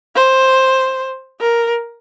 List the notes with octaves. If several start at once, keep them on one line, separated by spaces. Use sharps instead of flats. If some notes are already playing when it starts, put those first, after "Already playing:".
C5
A#4